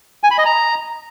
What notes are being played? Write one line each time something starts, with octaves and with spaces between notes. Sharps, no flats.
G#5
B5
D#5
A#5